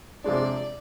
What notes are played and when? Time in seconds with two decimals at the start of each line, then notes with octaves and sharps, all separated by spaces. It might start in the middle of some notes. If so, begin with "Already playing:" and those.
0.24 C3 F3 G#3 D4 D5